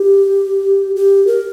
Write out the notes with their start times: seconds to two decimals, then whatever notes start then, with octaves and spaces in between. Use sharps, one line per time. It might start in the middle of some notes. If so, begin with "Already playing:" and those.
Already playing: G4
0.96 G4
1.27 A#4